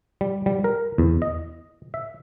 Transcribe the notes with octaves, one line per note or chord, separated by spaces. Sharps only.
G3
G3
A#4
E2
D#5
E5